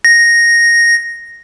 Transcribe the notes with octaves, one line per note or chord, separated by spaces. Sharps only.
A#6